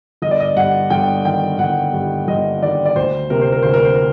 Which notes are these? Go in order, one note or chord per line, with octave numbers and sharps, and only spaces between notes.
G1 D#5
D5
D#5
G2 F#5
G1 G5
D#3 G5
G1 F#5
G2
G1 D#5
D#3 D5
D5
D2 C5
C3 A#4
C5
A#4
D2 C5
A#4
C5
A#4